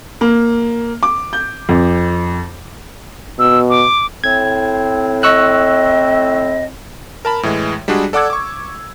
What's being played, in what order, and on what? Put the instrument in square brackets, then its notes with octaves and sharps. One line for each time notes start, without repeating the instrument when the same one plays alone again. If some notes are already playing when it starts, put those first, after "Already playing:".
[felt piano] A#3
D6
G6
F2
[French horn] B2 [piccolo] E6
[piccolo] D6
[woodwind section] A2 C4 [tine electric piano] G#6
[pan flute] D#5 [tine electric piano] C#6 E6 F#6
[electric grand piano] A#4 A5 B5
A2 E3 G#3
G3 G#3 D4 F#4 G#4
A4 D5 F#5 D6 E6 G#6
C#6 D6